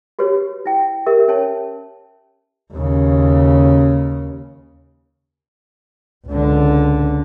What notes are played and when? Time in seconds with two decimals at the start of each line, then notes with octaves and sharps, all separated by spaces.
0.19 F#4 G4 B4 C#5
0.66 E4 G5
1.06 G4 A#4 E5
1.28 C#4 C#5 A5
2.74 D#2 C#3
6.27 C#2 D3